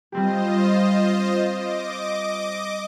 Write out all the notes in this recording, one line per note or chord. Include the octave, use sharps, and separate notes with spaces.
G3 C4 F4 G4 C5 D#5
D#5 D6